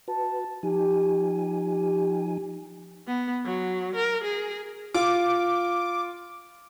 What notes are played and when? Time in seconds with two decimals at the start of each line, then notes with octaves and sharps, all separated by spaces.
0.08 F#4 B4 A5
0.63 F3 D#4 G4 G#5
3.07 B3
3.45 F#3
3.95 A#4
4.24 G#4
4.94 F4 D6